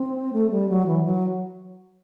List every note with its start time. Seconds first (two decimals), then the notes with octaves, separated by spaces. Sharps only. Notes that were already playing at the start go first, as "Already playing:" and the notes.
Already playing: C4
0.33 A3
0.51 G3
0.69 F#3
0.86 E3
1.05 F#3